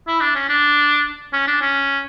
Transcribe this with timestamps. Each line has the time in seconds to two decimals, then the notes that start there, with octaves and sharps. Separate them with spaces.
0.07 E4
0.20 D4
0.35 C#4
0.49 D4
1.33 C#4
1.47 D4
1.61 C#4